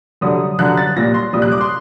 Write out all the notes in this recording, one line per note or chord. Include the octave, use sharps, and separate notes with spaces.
F#2 D3 G3 D#6
F#2 D3 G3 F#6
A6
A#2 G3 A#6
C6
A#2 G3 D#6
F#6
D6
C6